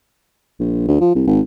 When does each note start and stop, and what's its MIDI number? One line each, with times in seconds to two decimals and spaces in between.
0.59 0.85 34
0.88 0.99 38
1.01 1.13 53
1.15 1.27 36
1.27 1.40 32